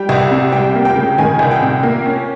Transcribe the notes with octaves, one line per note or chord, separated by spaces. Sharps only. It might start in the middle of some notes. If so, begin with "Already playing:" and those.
Already playing: G3 G5
C2
C3
G3 G5
A#3
G5
C#3
D#3 G#5
C2
G5
C3
A#3
C#4